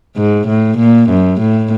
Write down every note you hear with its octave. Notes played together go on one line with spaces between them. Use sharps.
G#2
A2
A#2
F#2
A2